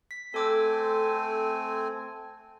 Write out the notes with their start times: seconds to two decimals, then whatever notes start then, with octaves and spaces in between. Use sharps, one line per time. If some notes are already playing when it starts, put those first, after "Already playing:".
0.11 B6
0.34 A3 C4 A4 G#5 D6 E6